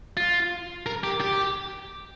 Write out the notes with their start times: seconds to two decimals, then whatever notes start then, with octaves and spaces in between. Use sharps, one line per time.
0.17 F4
0.86 A#4
1.04 G4
1.21 G4